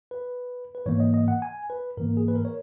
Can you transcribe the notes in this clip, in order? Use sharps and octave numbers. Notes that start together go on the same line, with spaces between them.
B4
B4
G#2 E3 A#3 C#5
D#5
D#5
F#5
G#5
B4
G#2 E3 A#3 A#4
G#4
B4
A#4
C#5